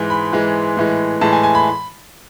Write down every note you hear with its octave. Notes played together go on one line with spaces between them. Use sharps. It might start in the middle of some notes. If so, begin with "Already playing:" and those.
Already playing: G#2 E3 G#3
B5
G#2 E3 G#3
A2 E3 G#3
A2 E3 G#3 A5
G#5
G#5
B5